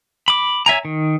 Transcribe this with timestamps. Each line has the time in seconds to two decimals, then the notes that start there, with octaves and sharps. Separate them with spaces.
0.28 B5 D6
0.66 C#5 E5 G#5 A#5
0.85 D#3